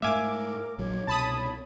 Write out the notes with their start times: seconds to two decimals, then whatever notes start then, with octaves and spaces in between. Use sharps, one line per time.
0.02 G#2 A3 A#4 E5 F5 G#5 D6
0.78 A#1 F#3 C#5
1.07 C2 B2 A5 B5 D#6